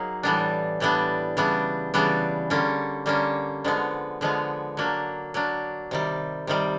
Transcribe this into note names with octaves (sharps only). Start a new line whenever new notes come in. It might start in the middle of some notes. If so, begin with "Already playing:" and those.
Already playing: F#3 A#3 D#4 G#4
A2 E3 G3 B3 D4
A2 E3 G3 B3 D4
C#3 E3 G3 B3 D4
C#3 E3 G3 B3 D4
D3 G3 A#3 C#4
D3 G3 A#3 C#4
D3 F3 G#3 B3
D3 F3 G#3 B3
F#3 A#3 D4
F#3 A#3 D4
C3 D#3 G3
C3 D#3 G3